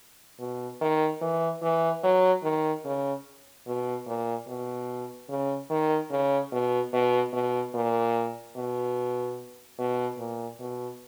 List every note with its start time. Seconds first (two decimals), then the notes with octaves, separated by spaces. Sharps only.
0.39 B2
0.81 D#3
1.21 E3
1.62 E3
2.04 F#3
2.44 D#3
2.84 C#3
3.67 B2
4.07 A#2
4.48 B2
5.29 C#3
5.70 D#3
6.10 C#3
6.52 B2
6.93 B2
7.33 B2
7.74 A#2
8.56 B2
9.79 B2
10.18 A#2
10.60 B2